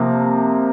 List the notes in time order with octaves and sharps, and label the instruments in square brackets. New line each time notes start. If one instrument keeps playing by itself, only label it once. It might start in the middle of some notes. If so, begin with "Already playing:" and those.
Already playing: [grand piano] C3 F3 A#3